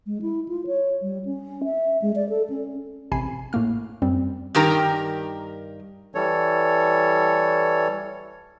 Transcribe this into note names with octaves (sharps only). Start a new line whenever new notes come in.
G#3
E4
F4
C#5
G3
C#4
E5
G#3
D5
A4
C#4
A1 C3 G#5 B5 C7
A2 A3 A#3 F6
F#2 G3 C4
G2 D#3 G4 A#4 A#5
E3 G3 A4 C#5